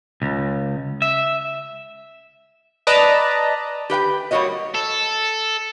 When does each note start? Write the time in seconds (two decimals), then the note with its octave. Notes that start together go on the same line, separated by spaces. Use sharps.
0.22 C#2
1.02 E5
2.87 B4 D5 D#5 A5 A#5
3.90 G4 B4 F#5 G5
4.31 G3 A#3 F4 F#4 C#5 D#5
4.74 A4